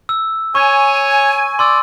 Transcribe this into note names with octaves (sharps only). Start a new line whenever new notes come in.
E6
C#5 G#5 C#6
D5 C6 E6